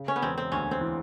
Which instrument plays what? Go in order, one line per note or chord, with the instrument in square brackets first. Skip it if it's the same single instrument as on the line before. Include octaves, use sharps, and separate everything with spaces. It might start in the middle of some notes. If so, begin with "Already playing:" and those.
Already playing: [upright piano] C#3
[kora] C#4
B3
[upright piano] E1 [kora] C4
[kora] C4
[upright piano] D2 [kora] C#4
[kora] C4
[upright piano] E3